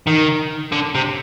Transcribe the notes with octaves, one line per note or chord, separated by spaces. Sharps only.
D#3
D3
C3